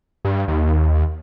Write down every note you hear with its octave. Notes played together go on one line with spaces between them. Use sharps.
G2
D#2